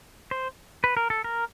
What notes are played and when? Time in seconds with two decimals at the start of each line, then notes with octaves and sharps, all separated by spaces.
0.31 C5
0.84 B4
0.97 A#4
1.10 A4
1.24 A#4